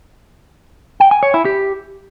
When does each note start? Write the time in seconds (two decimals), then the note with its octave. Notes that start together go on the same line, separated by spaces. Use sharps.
1.00 G5
1.11 G#5
1.23 C#5
1.34 E4
1.45 G4